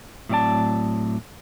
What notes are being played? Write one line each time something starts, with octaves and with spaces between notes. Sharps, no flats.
A2 F#3 C4 D5 A5